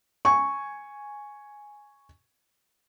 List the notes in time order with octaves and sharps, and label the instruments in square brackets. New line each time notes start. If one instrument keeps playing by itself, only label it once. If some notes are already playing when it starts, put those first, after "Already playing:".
[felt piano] G#5 C#6